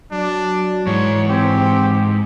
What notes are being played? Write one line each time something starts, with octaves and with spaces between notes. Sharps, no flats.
F#3 D4
G#2 E3 C#5
C4 G4